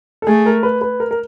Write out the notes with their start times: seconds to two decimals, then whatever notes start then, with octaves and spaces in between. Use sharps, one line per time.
0.22 A4
0.27 A3 G#4
0.46 A#4
0.63 B4
0.81 B4
1.00 A#4
1.11 A#4